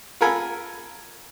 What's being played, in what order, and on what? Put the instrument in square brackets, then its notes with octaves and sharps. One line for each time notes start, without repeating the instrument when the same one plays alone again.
[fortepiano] F4 A4 A#4 G#5 B5